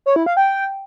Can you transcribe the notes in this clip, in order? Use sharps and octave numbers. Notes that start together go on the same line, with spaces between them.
C#5
E4
F5
G5